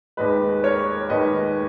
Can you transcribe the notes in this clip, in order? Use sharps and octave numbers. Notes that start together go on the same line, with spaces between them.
D#2 D#3 G#3 B4 D#5
A#4 C#5
D#2 D#3 G#3 B4 D#5